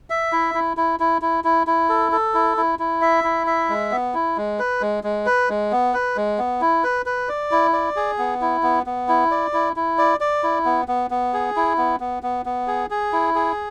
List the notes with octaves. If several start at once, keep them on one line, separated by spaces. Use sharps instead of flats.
E5
E4
E4
E4
E4
E4
E4
E4
A4
A4
E4
E4
E4
E5
E4
E5
G#3
B3
E4
G#3
B4
G#3
G#3
B4
G#3
B3
B4
G#3
B3
E4
B4
B4
D5
E4
D5
G#4
B3
E4
B3
B3
E4
D5
E4
E4
D5
D5
E4
B3
B3
B3
G#4
E4
B3
B3
B3
B3
G#4
G#4
E4
G#4